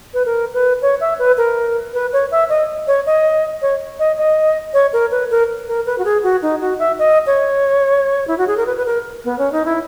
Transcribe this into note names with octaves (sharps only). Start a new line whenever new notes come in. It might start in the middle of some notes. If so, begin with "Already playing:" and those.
B4
A#4
B4
C#5
E5
B4
A#4
B4
C#5
E5
D#5
C#5
D#5
C#5
D#5
D#5
C#5
A#4
B4
A#4
A#4
B4
F#4
G#4
F#4
D#4
F#4
E5
D#5
C#5
E4
F#4
G#4
A#4
B4
B4
A#4
B3
C#4
D#4
E4